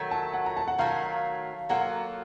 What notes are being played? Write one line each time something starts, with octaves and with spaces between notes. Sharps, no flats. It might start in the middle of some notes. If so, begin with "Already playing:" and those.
Already playing: D#3 F#3 A3
A5
F#5
A#5
A5
F#5
D#3 F#3 A3 F5
F#3 A#3 F4 A4 F#5